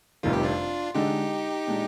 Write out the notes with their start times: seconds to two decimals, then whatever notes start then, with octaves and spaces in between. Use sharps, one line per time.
0.23 F1 F2 C3 D#3 G3 F4
0.33 G4
0.43 D4 F4
0.95 D3 G#3 D4 D#4 G4
1.67 A#2 G#3 D4